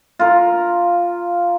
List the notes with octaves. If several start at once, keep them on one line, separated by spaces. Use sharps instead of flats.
F4 A#4